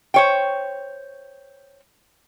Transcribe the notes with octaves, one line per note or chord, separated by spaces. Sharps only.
C5 C#5 G5